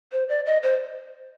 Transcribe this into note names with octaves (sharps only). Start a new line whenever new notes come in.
C5
D5
D#5
C5